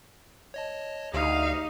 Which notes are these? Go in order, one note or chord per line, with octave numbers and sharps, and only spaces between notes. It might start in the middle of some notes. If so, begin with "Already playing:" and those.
C#5 D#5 A5
D2 D#4 G4 F5